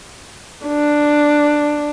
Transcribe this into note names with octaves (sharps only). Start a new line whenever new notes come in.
D4